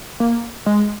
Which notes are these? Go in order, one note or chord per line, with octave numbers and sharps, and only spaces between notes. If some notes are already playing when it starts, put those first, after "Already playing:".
A#3
G#3